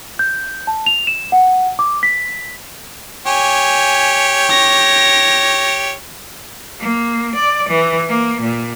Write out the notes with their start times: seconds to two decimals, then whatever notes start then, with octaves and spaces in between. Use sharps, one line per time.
0.19 G6
0.67 A5
0.86 F7
1.07 E7
1.32 F#5
1.79 D6
2.03 B6
3.26 G4 C#5 G#5
4.50 A#6
6.80 A#3
7.36 D5
7.69 E3
8.09 A#3
8.41 A#2